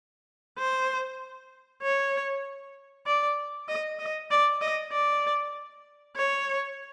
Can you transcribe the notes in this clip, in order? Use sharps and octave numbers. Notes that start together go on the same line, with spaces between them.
C5
C#5
D5
D#5
D#5
D5
D#5
D5
C#5